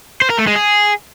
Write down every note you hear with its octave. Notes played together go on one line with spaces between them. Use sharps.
C5
A#4
A3
G#3
G#4